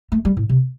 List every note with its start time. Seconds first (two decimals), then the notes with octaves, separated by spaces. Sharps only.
0.12 A3
0.25 G3
0.37 A2
0.49 C3